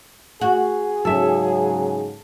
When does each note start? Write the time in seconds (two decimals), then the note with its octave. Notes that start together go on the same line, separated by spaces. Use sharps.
0.41 F#4 G#4
1.05 G#2 C#3 F#3 A4 E5